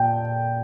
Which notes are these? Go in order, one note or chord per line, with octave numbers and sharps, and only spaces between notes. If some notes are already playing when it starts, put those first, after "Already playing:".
Already playing: A#2 G5 A5